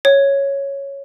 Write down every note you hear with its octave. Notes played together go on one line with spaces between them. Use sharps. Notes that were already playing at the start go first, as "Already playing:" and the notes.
C#5